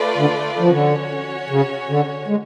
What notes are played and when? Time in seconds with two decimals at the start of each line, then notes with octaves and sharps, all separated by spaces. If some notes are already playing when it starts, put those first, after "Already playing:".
Already playing: A3 F4 B4 D5
0.18 D3
0.59 F3
0.70 D3 C#4 F#4 C#5
1.50 C#3
1.89 D3
2.28 G#3